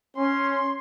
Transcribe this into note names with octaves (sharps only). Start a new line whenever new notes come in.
C#4 C6